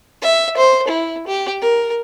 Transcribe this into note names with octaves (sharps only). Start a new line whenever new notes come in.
E5
C5
E4
G4
A#4